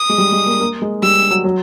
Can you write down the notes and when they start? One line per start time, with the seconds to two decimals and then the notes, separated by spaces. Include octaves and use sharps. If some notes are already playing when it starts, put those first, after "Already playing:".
Already playing: D#6
0.09 G#3
0.18 G3
0.32 G#3
0.47 A#3
0.60 A#3
0.82 G#3
1.02 G3 E6
1.31 F#3
1.44 F#3